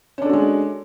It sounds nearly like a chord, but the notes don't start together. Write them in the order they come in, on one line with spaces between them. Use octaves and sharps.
C#4 D4 A4 F#4 G#3